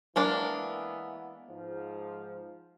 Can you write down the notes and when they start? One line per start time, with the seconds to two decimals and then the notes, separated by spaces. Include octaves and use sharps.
0.16 E3 G#3 A#3 B3 D4 E4
1.48 G#2 F3